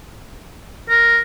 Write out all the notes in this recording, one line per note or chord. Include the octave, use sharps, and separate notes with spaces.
A#4